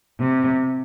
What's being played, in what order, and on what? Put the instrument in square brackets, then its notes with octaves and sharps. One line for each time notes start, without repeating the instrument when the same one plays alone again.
[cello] C3